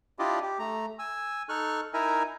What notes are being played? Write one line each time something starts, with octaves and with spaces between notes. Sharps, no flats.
D4 E4 F4 G4 D5 D#5
G4
A3 A#5
G#5 E6
D#4 A4 C#6 F6 F#6
D#4 E4 A#4 E5 G#5 A#5